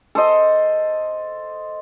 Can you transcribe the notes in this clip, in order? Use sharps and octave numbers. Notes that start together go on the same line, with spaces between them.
A4 C5 D#5